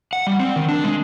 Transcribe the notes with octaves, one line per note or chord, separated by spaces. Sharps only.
F#5
G3
C4
D#3
D4
G#3